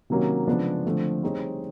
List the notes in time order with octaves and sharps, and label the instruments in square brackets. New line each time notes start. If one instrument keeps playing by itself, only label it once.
[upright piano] C3 D#3 F#3 A#3 C#4
C#3 F3 G#3 B3 D4
D3 F3 A3 C4
G3 C4 D#4 G#4 C#5